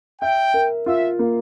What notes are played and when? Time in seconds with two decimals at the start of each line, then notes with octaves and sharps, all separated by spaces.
0.21 E5 G5
0.54 A#4
0.86 F4 E5
1.19 A#3